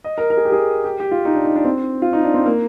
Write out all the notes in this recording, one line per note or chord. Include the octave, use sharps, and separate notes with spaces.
D#5
A#4
A#4
G#4
G4
G#4
G4
G4
F4
D#4
D4
D#4
D4
C4
F4
D#4
D4
C4
A#3